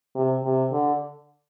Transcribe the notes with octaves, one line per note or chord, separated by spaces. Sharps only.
C3
C3
D3